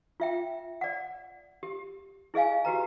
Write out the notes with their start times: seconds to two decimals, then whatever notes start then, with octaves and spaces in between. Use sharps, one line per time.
0.20 F4 E5 G5
0.81 D5 F#5
1.63 G4
2.34 E4 G#4 D#5 F5 G#5
2.65 F#4 G4 B4 A#5